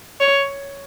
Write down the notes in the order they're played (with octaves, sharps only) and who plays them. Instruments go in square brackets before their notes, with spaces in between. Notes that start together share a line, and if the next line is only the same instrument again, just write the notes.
[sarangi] C#5